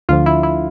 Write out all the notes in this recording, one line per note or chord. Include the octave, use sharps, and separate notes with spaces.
D2 D3 F3 F4
E4
E4